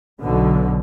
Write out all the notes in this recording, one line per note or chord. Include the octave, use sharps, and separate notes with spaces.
B1 B2 D3